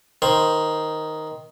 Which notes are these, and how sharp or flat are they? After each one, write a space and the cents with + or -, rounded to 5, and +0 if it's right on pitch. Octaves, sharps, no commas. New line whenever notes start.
D#3 +5 C5 +0